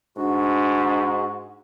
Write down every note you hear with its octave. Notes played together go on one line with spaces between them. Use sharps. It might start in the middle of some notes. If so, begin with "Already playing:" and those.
G#2 D4 F#4